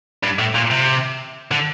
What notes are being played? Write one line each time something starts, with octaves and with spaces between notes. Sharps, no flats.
G2
A2
A#2
C3
D3